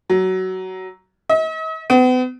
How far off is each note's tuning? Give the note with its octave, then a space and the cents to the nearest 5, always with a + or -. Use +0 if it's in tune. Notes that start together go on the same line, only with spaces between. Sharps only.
F#3 +15
D#5 +45
B3 +40